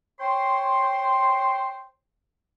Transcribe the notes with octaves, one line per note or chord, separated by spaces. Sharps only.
C5 C#5 G5 C6